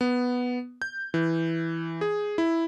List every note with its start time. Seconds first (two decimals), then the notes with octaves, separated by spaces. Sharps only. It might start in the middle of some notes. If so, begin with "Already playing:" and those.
0.01 B3
0.82 G6
1.14 E3
2.01 G#4
2.38 E4